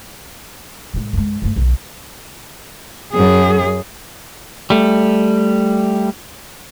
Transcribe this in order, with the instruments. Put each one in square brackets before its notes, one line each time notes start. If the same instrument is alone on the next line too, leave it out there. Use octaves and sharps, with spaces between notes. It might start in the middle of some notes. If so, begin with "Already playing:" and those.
[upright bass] A2 G#3
F#2 G#3
G2 A3
B1 D3
[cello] F#2 G#4
[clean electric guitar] G3 A3